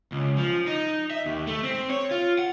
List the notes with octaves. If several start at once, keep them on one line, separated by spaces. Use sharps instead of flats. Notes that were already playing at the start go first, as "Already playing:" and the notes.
C#2
F3
D#4
E5
D#2
A3
C4
C#5
F4
F#5